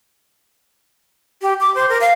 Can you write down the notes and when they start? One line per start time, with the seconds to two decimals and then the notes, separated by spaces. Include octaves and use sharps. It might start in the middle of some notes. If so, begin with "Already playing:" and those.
1.42 G4
1.61 D6
1.75 C5
1.89 A#4
2.01 F5